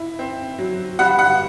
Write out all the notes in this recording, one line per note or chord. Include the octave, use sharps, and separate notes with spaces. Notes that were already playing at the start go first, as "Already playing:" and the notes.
Already playing: E4
C4
F#3
G3 F#5
F#5